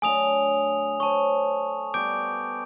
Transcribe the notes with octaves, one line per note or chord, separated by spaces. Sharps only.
D3 F#3 A3 G#5 D#6 F7
C5 C#5 A5 C#6
G3 B3 D6 G6 D7